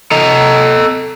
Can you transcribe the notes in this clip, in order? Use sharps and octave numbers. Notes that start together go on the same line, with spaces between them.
A4 D#5 A#5